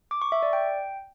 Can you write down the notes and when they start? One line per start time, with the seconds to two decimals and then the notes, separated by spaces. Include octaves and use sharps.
0.11 D6
0.22 C#6
0.32 E5
0.43 D5
0.53 G5